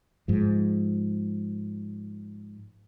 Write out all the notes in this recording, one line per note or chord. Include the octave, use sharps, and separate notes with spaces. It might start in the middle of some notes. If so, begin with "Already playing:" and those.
G#2 F3